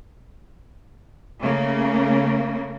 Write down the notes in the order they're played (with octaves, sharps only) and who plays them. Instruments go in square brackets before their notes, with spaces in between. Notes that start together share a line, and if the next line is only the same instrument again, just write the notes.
[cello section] C#3 A3 A#3